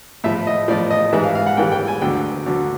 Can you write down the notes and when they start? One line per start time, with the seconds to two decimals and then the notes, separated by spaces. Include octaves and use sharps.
0.24 A2 F3 E5
0.47 D#5
0.68 A2 F3 D5
0.91 D#5
1.13 G#2 E3 G3 E5
1.24 F5
1.35 F5
1.47 F#5
1.57 G#2 E3 G3 G5
1.72 G5
1.88 G#5
2.02 D2 D3 F#3 G5
2.46 D2 D3 F#3